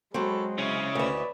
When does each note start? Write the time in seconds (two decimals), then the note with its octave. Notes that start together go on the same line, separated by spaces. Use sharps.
0.14 F#3 G#3 C4 A4 C#5 B5
0.58 C#3 C#4 E4 C#5 D#5
0.95 D2 B4 D5 E5